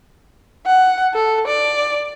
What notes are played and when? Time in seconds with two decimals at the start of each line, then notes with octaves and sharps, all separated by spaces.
0.66 F#5
1.14 A4
1.47 D5